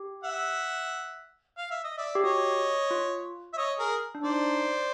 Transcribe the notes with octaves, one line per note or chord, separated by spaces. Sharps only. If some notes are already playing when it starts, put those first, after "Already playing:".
Already playing: G4
E5 F#5
F5
E5
D#5
D5 E5
G4
F#4 C#5 D#5
F4
E5
C#5 D#5
G#4 A#4
D4
D#4 C5 D5